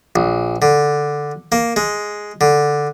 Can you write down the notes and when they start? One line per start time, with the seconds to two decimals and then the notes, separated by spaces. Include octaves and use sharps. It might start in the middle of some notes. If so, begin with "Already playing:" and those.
0.16 A#1
0.62 D3
1.52 A#3
1.76 G#3
2.41 D3